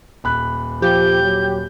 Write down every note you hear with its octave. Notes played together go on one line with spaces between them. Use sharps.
D#1 B5 F#6
F3 G4 G6
F#3